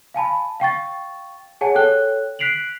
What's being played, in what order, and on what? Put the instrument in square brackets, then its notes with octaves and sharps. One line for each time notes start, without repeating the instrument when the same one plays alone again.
[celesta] F5 G#5 A5 B5
F5 G5 C#6 A6
G#4 C#5 F#5 G#5 A5
A4 C#5 G5 F#6 G7
F#6 B6 C7 D7 F7 F#7